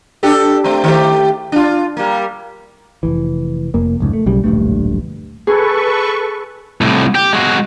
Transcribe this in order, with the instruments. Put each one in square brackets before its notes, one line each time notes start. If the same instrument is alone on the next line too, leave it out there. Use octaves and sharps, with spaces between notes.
[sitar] D4 G4 A4
A3 C4
D#3 A3 G4
D4 F4
G3 A#3
[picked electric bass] F1 C#2 E3
F1 F2 A#3
F1 C#2 G#2
A3
B1 C#3 G3
D1 A#1 G2 A3
[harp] G#4 [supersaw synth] A4 B4 C#6
[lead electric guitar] C2 A2
G4
G#3 F#4